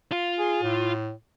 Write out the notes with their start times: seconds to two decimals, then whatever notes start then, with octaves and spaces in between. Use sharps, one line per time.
0.12 F4
0.39 G#4
0.62 A2